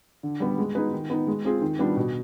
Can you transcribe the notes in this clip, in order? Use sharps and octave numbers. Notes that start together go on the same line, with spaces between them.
D3
G3 B3
G#3
B3 D#4 G#4 B4
D#3
B3 D#4
G#3
C4 F4 G#4
D#3
G3 B3 D4 F4
B2